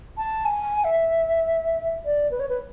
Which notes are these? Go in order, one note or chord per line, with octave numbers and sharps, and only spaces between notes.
A5
G#5
E5
D5
B4
C#5
B4